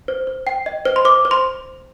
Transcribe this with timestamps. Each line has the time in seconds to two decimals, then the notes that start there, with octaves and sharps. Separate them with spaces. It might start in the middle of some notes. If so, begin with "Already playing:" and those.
0.08 C5
0.27 C5
0.47 G5
0.66 D#5
0.85 C5
0.96 C6
1.05 C5 D6
1.25 C5
1.31 C6